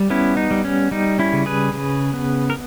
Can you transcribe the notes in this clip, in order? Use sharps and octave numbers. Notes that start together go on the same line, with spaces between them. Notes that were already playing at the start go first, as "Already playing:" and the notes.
Already playing: G3
B3 C#4 E4
D#4
G3
C#4
G3 D#4
C#4 E4
C#3
G#4 B4
C#3
B3
A#4